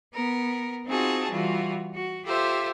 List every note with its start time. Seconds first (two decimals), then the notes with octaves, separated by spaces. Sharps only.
0.13 B3 A#4
0.86 C4 D#4 F4 F#4 G#4 A5
1.30 E3 G3 F4 F#4
1.95 F#4
2.24 F4 G4 A4 C5 E5